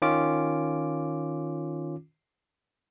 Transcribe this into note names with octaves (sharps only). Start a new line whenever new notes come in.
D#3 C#4 F4 D6